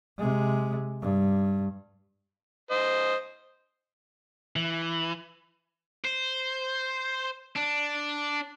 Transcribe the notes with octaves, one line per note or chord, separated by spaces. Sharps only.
C3 G#3
G2
C5 D#5
E3
C5
D4